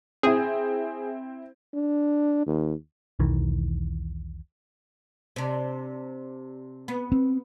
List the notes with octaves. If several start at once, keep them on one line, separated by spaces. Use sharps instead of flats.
C4 E4 G#4
D4
D#2
E1 B1 D#3 E3
C3 D4
B3
C4